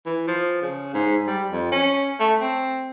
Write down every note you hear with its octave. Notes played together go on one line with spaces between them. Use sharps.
E3
F3
C#3
G#2
G3
F2
C#4
A3
C4